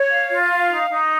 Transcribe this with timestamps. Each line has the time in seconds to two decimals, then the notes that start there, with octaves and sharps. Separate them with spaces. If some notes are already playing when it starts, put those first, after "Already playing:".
Already playing: C#5
0.10 F5
0.30 F4
0.50 F5
0.69 D#4
0.89 D#4